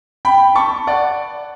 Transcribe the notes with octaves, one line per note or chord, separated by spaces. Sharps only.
G5 B5
A5 C#6
D5 F#5